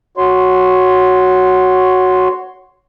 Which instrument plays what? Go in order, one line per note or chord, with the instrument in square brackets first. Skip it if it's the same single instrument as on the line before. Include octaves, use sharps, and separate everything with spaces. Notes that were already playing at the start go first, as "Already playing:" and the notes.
[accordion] F#4 C#5 C6